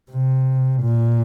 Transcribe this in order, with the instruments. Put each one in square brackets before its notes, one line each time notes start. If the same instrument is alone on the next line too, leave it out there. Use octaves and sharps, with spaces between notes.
[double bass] C3
A#2